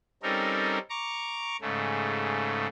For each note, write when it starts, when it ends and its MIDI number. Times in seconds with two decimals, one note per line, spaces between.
0.23 0.79 55
0.23 0.79 60
0.23 0.79 61
0.23 0.79 63
0.23 0.79 69
0.23 0.79 70
0.90 1.57 82
0.90 1.57 85
0.90 1.57 86
1.61 2.67 44
1.61 2.67 49
1.61 2.67 57